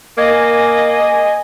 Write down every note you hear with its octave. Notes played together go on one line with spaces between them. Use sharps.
A#3 D#5 G#5